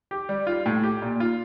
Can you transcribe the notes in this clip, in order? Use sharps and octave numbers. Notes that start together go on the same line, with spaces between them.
G4
G3
F4
A2
G4
A#2
F4